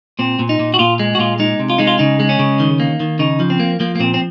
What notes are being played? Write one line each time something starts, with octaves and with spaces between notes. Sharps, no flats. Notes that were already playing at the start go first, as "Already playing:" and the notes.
A#2 C4
A#2
D#4
A#2
F#4
A#2 F4
G#3
F#4
A#2 F4
G#3 D#4
C3
F4
G#3 D#4
F4
C#3 D#4
G#3
C#4
C#3
D#3
A#3
D#3
C#3 D#4
F3
C4
A#3
F3 A#3
A#3
A#2 C4
C4